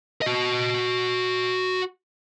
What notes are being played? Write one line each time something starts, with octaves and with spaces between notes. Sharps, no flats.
F#4 D#5